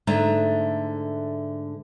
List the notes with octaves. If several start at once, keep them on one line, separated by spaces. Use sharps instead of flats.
G#2 D3 A3 E5 A#5